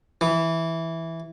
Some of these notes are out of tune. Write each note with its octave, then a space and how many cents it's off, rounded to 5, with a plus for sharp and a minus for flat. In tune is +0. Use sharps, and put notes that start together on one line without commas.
E3 -5